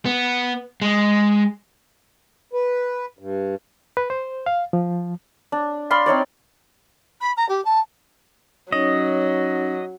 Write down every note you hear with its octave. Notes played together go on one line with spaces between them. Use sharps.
B3
G#3
B4
G2
B4
C5
F5
F3
D4
D5 F5 B5 C6
C4 D#4 C#5 D5
B5
A#5
G4
A5
F#3 C#4 D#4 C#5 D#5